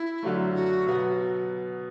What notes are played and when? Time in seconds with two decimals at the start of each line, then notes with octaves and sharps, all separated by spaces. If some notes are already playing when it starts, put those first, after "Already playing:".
Already playing: E4
0.23 F#2 D3 F#3 A3
0.55 F#4
0.87 B2 F#3 B3